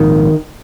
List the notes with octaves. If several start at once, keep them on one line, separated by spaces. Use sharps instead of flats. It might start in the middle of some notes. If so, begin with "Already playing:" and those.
Already playing: A#1 G#2 D#3